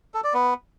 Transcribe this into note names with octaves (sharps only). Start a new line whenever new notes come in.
A4
D5
B3